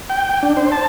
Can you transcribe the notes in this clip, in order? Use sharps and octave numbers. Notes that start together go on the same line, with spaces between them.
G5
G5
D4
C5
A5